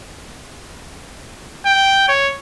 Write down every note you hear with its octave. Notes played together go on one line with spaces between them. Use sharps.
G5
C#5